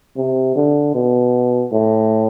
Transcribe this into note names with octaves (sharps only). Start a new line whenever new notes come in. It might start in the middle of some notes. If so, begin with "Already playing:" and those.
C3
D3
B2
A2